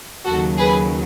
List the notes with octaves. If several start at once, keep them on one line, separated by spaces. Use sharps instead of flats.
D#2 C#3 F#3 F#4 A4
G#4 B4